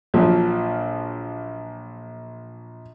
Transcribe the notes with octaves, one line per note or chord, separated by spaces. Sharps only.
A#1 A#2 F3 F#3